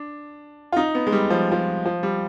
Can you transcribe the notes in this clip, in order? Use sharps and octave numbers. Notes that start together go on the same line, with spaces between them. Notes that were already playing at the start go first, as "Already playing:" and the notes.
Already playing: D4
F4
D#4
B3
G#3
G3
F3
F3
F3
G3